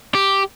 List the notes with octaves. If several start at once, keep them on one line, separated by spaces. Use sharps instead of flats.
G4